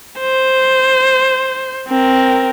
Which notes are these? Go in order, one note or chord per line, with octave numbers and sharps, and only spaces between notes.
C5
C4 A#4